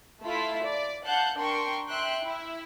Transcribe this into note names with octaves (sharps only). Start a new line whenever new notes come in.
A3 E4 F4 B6
D5
F5 F#5 A5 F#6 G6
D4 A#4 G5 C6 C#6
E5 G5 C6 F#6
E4